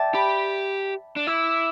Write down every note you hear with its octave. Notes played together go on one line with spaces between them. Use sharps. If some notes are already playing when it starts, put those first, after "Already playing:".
Already playing: D5 E5 G5 A5
G4 B5
D4
E4 D6